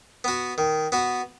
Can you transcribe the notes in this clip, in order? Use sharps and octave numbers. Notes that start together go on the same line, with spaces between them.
B3 F#4
D#3
B3 F#4